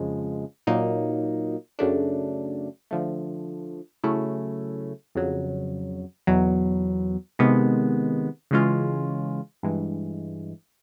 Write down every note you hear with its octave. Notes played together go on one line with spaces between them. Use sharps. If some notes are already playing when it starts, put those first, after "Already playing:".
Already playing: F2 C#3 F3 G#3
A#2 F#3 A#3 D#4
F#2 C#3 F#3 A3 D4
D3 F3 A3
C#3 F#3 A3 C#4 E4
F2 C#3 F#3
E2 B2 F#3
C3 D#3 G#3 B3
C#3 E3 G#3 C#4 F4
G2 E3 G#3